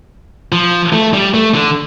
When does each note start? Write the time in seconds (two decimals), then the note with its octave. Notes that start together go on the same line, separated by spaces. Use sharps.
0.52 F3
0.93 A3
1.14 G3
1.34 A3
1.55 D3